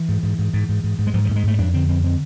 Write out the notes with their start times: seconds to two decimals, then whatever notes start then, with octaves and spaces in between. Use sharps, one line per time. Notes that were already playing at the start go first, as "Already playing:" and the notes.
Already playing: E3
0.09 G#2
0.23 G#2
0.39 G#2
0.53 G#2
0.69 G#2
0.84 G#2
0.99 G#2
1.07 G#3
1.14 G#2 F3
1.25 F3
1.29 G#2 A3
1.36 G#3
1.44 G#2 A3
1.59 F2 D4
1.74 D3 C4
1.88 F2 C4
2.03 D3 C4